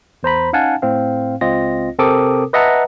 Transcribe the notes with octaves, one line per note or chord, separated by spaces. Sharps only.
E2 C5 A#5 B5
C#4 D#4 F5 F#5 G#5 A5
A2 C4 F5
C#2 C4 F4 D#5 A#6
C3 C4 A4 A#4 D6 D#6
B4 D#5 E5 F#5 A5 A#5